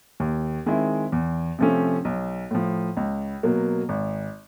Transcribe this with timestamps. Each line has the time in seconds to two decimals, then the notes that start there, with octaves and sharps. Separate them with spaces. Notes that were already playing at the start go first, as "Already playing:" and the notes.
0.20 D#2
0.66 D#3 G#3 C4 E4
1.12 E2
1.59 C3 F3 A3 C#4
2.05 B1
2.51 A2 F3
2.97 C#2
3.43 B2 F#3 A#3
3.89 G#1